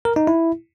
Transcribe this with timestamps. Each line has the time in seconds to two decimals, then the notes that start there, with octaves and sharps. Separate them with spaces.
0.05 A#4
0.16 D#4
0.27 E4